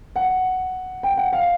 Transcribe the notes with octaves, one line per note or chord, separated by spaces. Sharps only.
F#5
G5
F#5
F5